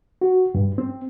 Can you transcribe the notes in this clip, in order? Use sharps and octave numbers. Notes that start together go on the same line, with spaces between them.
F#4
G2
C4